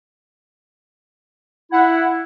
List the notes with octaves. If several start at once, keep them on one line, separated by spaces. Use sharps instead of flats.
E4 F#5